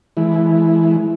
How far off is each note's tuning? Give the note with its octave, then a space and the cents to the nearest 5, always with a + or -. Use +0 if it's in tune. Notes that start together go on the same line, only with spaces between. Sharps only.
E3 +0 G#3 +30 E4 +0